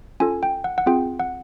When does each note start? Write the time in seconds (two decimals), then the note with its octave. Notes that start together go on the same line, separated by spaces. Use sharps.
0.20 C#4 F4 A4 G#5
0.43 G5
0.64 F#5
0.78 F#5
0.86 C4 F4 G#4 G5
1.19 F#5